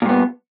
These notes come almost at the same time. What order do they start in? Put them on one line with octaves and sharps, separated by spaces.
A#2 G2 B3